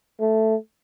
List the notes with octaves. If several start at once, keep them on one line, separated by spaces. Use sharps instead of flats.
A3